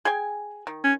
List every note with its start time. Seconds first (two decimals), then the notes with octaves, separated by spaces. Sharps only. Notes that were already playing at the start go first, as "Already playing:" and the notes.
0.05 G#4 G5 G#5
0.67 D#3
0.84 C#4